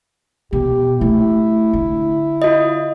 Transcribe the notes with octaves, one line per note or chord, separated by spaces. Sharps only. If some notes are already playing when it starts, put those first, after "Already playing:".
B2 G4
A3 E4
D3
F4 D#5